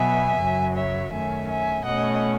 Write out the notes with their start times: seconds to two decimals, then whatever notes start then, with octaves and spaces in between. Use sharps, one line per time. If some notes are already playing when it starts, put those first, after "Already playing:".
Already playing: B2 F#3 B3 E5 G#5
0.39 F#2 C#3 F#3
0.75 C#5 E5
1.12 F#2 D#3 A3 C#4 E5 G#5
1.48 E5 G#5
1.85 B2 A3 C#4 D#5 F#5